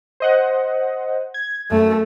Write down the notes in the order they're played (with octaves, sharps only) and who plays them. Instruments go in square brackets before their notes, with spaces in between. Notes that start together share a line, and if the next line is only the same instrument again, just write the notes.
[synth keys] C5 D#5 F#5
G#6
[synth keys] F#2 [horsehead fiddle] A3